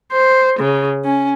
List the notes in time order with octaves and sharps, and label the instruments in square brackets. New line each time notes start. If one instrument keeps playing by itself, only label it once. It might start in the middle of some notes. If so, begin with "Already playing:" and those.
[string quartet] C5
C#3
C#4